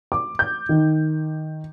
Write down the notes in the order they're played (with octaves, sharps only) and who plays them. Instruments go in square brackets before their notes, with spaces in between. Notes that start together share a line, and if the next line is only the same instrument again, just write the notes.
[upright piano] D6
G6
D#3